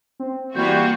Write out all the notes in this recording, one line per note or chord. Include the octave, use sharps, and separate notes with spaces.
C4
E3 G3 A#3 F4 F#4 G6